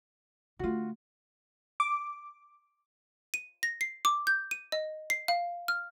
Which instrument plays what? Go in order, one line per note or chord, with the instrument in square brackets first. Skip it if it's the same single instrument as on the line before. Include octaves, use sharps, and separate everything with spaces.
[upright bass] D3 A3 [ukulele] F4 F#4
[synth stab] D6
[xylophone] D#7
A#6
C7
D6
G6
D#7
D#5
C7
F5
F6